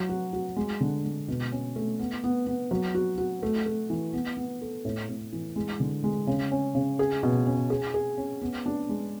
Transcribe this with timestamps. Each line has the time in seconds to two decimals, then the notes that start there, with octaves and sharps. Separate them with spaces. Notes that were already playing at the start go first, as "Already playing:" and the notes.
Already playing: F#3
0.09 F#4
0.33 F#4
0.56 G#3
0.81 D3
1.05 G#3
1.28 B2
1.52 C#4
1.76 A3
1.99 B3
2.24 B3
2.47 B3
2.71 F#3
2.95 F#4
3.18 F#4
3.43 A3
3.66 A3
3.90 E3
4.13 B3
4.37 B3
4.61 A4
4.85 A2
5.09 A2
5.33 E3
5.56 G#3
5.80 D3
6.04 G#3
6.27 C#3
6.51 C#4
6.75 C#3
6.99 G#4
7.23 B2
7.47 C#4
7.70 G#4
7.94 G#4
8.18 C#4
8.42 B3
8.66 D4
8.89 G#3